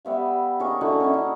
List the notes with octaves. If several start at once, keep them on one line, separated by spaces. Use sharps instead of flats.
G3 B3 E5 F5
D#3 A#3 G#4 C#5
D3 D#4 E4 F#4
C#4 D4 E4
D#4